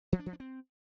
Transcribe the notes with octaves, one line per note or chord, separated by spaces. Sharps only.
F3
D4
F3
D4
C4